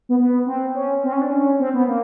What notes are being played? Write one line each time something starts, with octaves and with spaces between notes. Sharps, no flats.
B3
B3
C4
C#4
C4
C#4
D4
C#4
C4
B3
A#3